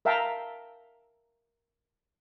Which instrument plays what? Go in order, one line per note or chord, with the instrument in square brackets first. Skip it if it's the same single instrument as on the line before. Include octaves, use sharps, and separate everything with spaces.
[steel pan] A#4 E5 F5 G5 A5 A#5